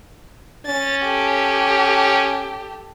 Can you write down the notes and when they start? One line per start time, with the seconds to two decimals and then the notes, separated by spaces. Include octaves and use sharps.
0.66 C#4 A6
1.04 G4 A4